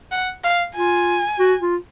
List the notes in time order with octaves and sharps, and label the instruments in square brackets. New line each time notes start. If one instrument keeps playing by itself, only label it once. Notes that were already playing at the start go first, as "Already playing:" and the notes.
[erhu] F#5
F5
[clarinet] F4 [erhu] G#5
[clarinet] F#4
F4